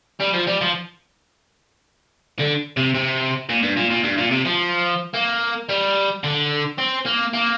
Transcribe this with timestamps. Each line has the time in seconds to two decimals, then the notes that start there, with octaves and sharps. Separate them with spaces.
0.20 G3
0.34 F3
0.47 G3
0.61 F3
2.39 D3
2.77 C3
2.95 C3
3.50 A#2
3.63 G2
3.77 A#2
3.91 A#2
4.04 G2
4.18 A#2
4.31 C3
4.45 F3
5.14 A#3
5.69 G3
6.24 D3
6.79 C4
7.06 A#3
7.33 A#3